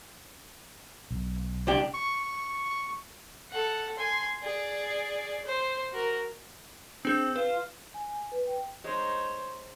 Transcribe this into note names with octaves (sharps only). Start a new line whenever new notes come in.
B1
C2 D4 G4
C#6
A4 F#5
G#5 C6
G#4 D5
C5
F#4 A#4
C4 D4 G#4 G6
F4 B4
G#5
B4
G5
G#3 D#4 C5 C#5